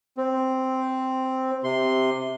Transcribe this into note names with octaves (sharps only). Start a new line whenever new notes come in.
C4
C3 C6